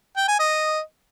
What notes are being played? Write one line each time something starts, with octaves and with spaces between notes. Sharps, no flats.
G5
G#5
D#5